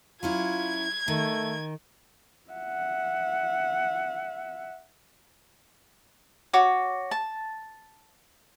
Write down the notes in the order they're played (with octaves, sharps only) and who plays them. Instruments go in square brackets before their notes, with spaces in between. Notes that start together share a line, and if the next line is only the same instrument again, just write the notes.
[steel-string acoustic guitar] F#3 C#4 E4 [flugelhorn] F4 [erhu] G#6
[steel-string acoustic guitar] D#3 [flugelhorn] A3
[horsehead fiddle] E5 F#5
[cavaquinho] F#4 C#5 D6
A5